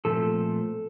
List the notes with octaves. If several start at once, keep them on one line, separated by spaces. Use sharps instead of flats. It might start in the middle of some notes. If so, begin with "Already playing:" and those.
A#2 F3 A3 C4 A4